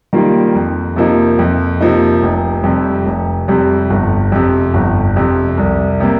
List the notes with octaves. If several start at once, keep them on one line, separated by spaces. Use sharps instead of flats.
D#3 G3 A#3 F4
F2
C3 F3 A#3 D#4
F2
C3 F3 A#3 D#4
F1
F2 C3 G3
F1
F2 C3 G3
G1
F2 C3
G1
F2 C3
C2
C3 G3 A#3